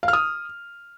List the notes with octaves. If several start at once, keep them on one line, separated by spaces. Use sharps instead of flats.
F5
F6
D#6